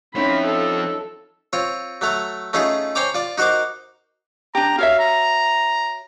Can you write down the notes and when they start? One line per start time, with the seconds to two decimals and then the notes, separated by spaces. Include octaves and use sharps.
0.15 F3 C4 C#4 D#4 E4 B5
0.45 A4
1.53 C4 F4 C#5
2.01 F#3 A3 A#5
2.53 A3 C#4 D#4 F4 G#4
2.95 C5 C#5 G5 G#5 A#5 D6
3.14 F4 D5
3.38 D#4 F#4 A#4 C5 D6
4.55 D4 G4 A#5
4.78 F#4 C#5 E5 F5
4.99 A#5